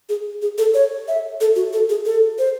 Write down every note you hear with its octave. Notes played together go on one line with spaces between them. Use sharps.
G#4
G#4
A4
C#5
E5
A4
F#4
A4
G#4
A4
C5